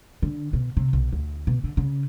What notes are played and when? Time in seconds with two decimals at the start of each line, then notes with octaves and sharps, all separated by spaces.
0.22 D3
0.53 B2
0.77 C3
0.93 B1
1.12 D2
1.47 B2
1.64 D3
1.77 C#3